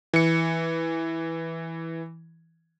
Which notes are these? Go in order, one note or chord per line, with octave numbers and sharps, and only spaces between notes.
E3 C#7